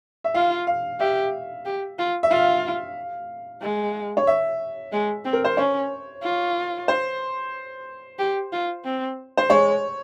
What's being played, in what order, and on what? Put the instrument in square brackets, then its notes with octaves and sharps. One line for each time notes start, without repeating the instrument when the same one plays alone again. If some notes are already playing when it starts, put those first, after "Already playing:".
[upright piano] E5
[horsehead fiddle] F4 [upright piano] F5
[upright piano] F5
[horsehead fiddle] G4 [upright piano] E5
[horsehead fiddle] G4
F4
[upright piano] E5
[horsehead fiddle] F4 [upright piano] F5
[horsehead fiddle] G#3
[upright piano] C#5
E5
[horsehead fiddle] G#3
C4
[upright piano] A#4
C5
[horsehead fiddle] C#4 [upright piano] C#5
[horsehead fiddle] F4
[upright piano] C5
[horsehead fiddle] G4
F4
C4
[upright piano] C5
[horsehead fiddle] G#3 [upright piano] C#5